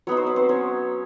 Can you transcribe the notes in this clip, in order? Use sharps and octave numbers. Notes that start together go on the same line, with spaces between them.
F#3 B3 D#4 C#5
C5
B4
C4 C5
C#4 C#5